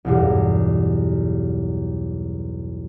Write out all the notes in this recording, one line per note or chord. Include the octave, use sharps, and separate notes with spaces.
B1 E2 G2